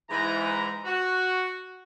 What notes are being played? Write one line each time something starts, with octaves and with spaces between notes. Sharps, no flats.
G#2 E3 A#5
F#4